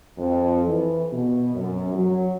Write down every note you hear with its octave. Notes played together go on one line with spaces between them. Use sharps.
F2
E3
B2
F#2
F#3